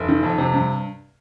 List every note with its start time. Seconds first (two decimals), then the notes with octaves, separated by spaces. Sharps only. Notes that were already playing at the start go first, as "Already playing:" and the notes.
Already playing: F1
0.09 D#3
0.23 F2
0.38 C3
0.54 G2